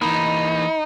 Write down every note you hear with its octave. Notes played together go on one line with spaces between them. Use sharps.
E3 A#3 D#4 B5